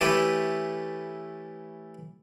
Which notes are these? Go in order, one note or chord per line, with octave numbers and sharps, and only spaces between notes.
E3 A3 C#4 G4 A4 B4